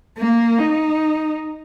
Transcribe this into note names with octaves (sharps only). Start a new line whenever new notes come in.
A#3
D#4